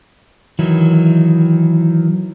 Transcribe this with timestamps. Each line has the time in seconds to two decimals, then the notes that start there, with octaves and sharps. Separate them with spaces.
0.59 D#3 E3 F#3